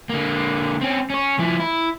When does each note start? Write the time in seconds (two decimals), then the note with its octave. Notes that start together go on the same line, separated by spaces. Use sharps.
0.09 D3 A#3
0.81 C4 C#4
1.10 C#4 C#5
1.39 F3 E4
1.60 E4